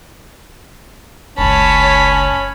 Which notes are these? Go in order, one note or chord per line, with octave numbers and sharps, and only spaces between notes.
F#1 C#2 C#4 C#5 A5 B5